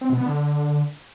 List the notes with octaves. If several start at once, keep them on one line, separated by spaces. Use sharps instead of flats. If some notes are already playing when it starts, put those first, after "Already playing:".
C4
B2
B3
D3